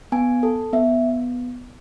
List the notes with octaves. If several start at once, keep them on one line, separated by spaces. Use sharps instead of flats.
B3 G#5
A4
B3 E5